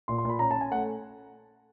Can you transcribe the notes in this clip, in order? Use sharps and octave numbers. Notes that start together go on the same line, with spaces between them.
A#2 C6
C6
A#2 B5
C#4 A#5
A5
C#4 G#5
A3 F#5